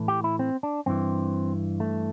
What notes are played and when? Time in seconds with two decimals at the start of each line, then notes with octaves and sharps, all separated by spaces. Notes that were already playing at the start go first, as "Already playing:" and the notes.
Already playing: A2 E3
0.08 G4
0.24 E4
0.39 C4
0.63 D4
0.86 G2 E3 C4
1.80 A3